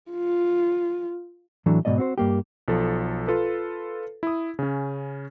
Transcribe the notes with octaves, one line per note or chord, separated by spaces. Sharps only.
F4
A2 E3 F#3 A3 D4
G#2 B2 F3 A#3 D5 D#5
C4 F#4 C5
G2 A#3 G4
B1 F3 A4
F4 A4 B4
E4 D#6
C#3 C#4